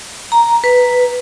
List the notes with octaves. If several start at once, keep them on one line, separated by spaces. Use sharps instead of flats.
A#5
B4